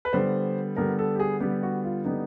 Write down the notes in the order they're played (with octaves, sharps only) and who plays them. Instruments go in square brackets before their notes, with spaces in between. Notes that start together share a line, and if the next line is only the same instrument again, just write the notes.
[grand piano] B4
D3 G3 B3 C5
D3 G3 B3 A#4
A4
G4
G#4
D3 G3 B3 G4
F#4
F4
D3 G3 B3 D#4